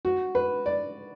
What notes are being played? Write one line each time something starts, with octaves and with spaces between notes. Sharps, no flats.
F#4
B4
D5